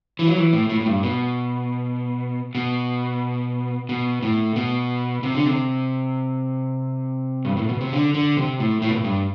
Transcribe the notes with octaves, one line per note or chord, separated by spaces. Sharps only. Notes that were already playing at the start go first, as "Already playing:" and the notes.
E3
F#3
E3
A2
A2
A2
G2
B2
B2
B2
A2
B2
C3
D3
C3
G2
A2
B2
C3
D3
D3
C3
A2
A2
B2
A2
G2